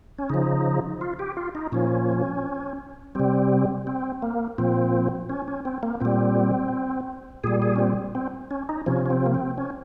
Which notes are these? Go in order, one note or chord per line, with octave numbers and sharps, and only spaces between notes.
C#4
C#3 F3 D#4
F4
G4
F4
D#4
A#2 F3 C#4
C3 G3 C4
C4
A#3
A#2 F3 C4
C#4
C#4
C4
A#3
A#2 G3 C4
A#2 G3 G#4
G#4
C#4
C4
C4
C#4
D#4
C3 F3 C#4
C#4
C4
A#3
C4
C#4